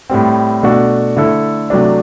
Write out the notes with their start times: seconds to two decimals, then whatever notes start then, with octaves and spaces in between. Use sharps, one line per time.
0.09 A2 G3 C4
0.63 B2 A3 D4 F#4 A4
1.17 D3 A3 E4 A4
1.70 C3 F#3 A3 D4